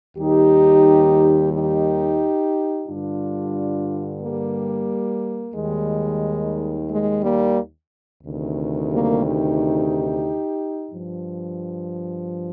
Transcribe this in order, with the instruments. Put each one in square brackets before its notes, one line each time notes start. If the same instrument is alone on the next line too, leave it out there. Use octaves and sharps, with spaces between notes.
[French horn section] D#2 D#3 G3 D#4 G4
D#4 G4
G2 D3 G3 D4 F4
G3 A#3
D#2 D#3 G3 G#3
G#3
G3 A#3
D2 C3 D#3
G3 A#3
D#4 G4
G2 F3